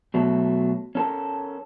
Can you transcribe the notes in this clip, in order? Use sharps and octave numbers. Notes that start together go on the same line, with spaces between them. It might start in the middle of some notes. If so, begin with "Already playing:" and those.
B2 F#3 A3
C#4 A4 A#4